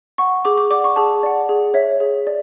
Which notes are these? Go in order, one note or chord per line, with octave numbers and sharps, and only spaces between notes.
F#5 C#6
G#4 D6
D6
D5 F#5 D6
C#6
G#4 A5
D5 F#5
G#4
C#5 E5
G#4
D5